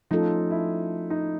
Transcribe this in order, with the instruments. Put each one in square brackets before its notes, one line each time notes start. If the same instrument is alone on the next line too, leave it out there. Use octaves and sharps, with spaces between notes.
[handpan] F3 A3 C#4 F4 A4 [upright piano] D#4
[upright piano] E4
D#4